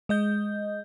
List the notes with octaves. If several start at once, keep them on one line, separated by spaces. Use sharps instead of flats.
G#3 D#5 G6